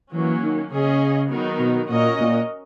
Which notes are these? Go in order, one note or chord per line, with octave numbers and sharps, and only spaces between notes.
E3 F#3 A#3 C#4
D#3
C#3 C#4 G#4 D#5
D#3 F#3 B3 D#4 A#4
B2
A#2 C#4 F#4 A#4 D#5
A#2